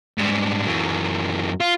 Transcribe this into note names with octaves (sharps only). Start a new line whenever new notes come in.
G#2 G3
F#2 E3
F4